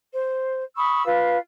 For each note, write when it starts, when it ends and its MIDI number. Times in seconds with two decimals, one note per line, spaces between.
0.12 0.62 72
0.75 1.04 83
0.75 1.04 85
0.75 1.04 87
0.75 1.04 88
1.04 1.37 65
1.04 1.37 71
1.04 1.37 77